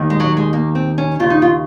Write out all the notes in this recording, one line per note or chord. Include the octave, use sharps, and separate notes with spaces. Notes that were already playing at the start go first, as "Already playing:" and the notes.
Already playing: D#2 D#3
G#3
F#3
G#3
A#3
C4
C#4
D#2 C#3 F4
D#4
F4